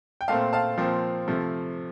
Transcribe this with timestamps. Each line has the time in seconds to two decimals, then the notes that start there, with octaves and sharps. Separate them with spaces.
0.21 G5
0.28 A#2 A3 C4 F5 A5
0.53 F5 A5
0.78 A#2 F3 C4
1.28 C3 F3 A3